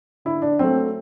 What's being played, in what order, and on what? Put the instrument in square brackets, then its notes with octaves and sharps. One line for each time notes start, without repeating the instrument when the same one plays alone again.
[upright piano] D3 E4
D4
F#3 A3 C4